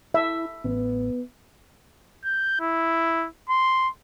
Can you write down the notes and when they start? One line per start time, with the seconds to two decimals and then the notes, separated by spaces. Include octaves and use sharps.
0.14 E4 E5
0.64 A1 B3
2.25 G6
2.61 E4
3.49 C6